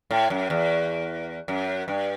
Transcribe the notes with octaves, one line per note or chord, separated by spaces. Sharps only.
A2
F#2
E2
F#2
G2